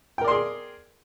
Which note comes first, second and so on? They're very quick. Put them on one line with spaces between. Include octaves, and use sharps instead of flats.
G5 A#4 D5 C6 G#4